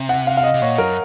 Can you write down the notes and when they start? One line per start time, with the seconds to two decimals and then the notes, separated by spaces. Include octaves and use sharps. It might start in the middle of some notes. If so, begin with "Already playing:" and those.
Already playing: C3
0.09 F#5
0.27 F5
0.37 F5
0.43 D#5
0.54 C3
0.61 A#2 C#5
0.78 F#2 A#4